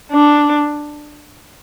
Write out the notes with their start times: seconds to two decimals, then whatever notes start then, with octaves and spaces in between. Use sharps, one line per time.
0.13 D4